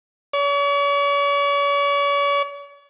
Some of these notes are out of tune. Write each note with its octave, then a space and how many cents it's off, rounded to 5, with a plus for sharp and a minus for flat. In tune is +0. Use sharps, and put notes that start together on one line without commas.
C#5 +40